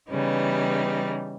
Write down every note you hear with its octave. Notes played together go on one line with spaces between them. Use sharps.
C#3 E3 G3 B3 D#4